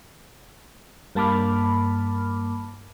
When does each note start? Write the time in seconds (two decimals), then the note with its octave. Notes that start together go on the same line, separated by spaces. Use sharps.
1.15 G2 A#3 A5 B5 D6 F6